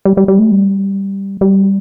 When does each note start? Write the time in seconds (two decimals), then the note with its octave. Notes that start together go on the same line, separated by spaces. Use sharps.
0.05 G3
0.17 G3
0.28 G3
0.39 A3
0.51 G3
1.41 G3